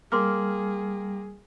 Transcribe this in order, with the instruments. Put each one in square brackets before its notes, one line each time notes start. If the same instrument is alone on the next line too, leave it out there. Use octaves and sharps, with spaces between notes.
[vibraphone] G3 [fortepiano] A#3 [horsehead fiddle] G#4 [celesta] C6 D6 F6